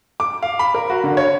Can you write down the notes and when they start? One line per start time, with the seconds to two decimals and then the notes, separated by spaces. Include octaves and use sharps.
0.20 D6
0.43 F5
0.59 B5
0.74 A#4
0.90 F#4
1.04 D3
1.17 C#5